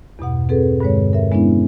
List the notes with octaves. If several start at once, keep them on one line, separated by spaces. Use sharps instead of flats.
E2 G2 B2 F#5
C4 G#4 A4 B4
G2 D3 G#3 C#5
A#4 E5
G#3 B3 C#4 D4 E4